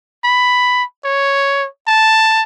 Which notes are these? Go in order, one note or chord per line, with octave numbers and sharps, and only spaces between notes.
B5
C#5
A5